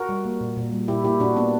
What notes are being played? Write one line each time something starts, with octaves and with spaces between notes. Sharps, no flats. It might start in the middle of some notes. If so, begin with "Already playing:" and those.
Already playing: F#4 A#4
G3
A#3
A#2
A#2
G3
A#2 E4 G4
A#3 E4 G4
A#2 D4 F#4
A#3 B3 D4